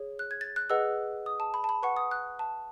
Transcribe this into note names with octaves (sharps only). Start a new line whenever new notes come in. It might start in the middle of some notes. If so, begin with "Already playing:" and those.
Already playing: G#4 C#5
F#6
G#6
A6
F#6
G#4 B4 D#5 F#5 E6
D#6
A5
B5
A5
B5
B4 F#5 C#6
D#6
F#6
A5